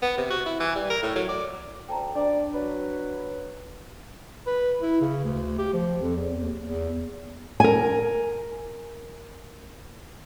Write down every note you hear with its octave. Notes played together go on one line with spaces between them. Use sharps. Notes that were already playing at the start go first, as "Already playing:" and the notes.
B3
C3
F#4
E4
E3
G3
A#4
A2
F#3
D5
D2 G5 A5 A#5
D4 D5
F#3 B4
B4
E4
C#3
D2
G4
F3
F2
E2
D#2
E2
A#4 G#5